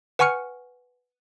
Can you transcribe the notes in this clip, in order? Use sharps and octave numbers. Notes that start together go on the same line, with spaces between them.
B4 F#5 G#5 C#6 F6 C#7